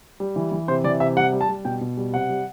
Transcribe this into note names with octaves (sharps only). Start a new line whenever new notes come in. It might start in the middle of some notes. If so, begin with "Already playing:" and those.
G3
E3
E3
C3 C5
E3 D5
C3 E5
G3 F#5
G3
A5
G3
B2 G5
B2
G3
C3 F#5
G3